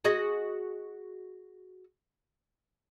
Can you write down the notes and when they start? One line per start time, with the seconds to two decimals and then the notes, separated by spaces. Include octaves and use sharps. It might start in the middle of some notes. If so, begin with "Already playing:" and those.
0.04 F#4 G#4 D#5